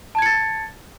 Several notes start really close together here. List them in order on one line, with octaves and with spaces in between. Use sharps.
A5 G#6 C#7 A6